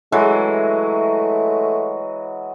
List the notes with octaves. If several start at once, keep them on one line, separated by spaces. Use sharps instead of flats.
E3 F#3 G#3 A3